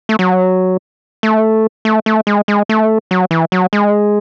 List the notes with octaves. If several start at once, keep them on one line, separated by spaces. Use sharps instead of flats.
A3
F#3
A3
A3
A3
G#3
G#3
A3
F#3
E3
F#3
G#3